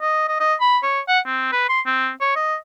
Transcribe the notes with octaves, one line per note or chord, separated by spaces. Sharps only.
D#5
D#5
D#5
B5
C#5
F#5
C4
B4
C6
C4
C#5
D#5